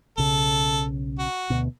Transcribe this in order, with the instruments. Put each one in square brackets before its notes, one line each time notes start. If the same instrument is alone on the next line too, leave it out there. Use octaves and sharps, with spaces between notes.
[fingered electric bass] B1 C#3 [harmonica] A4
[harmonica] F#4
[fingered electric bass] D2 B2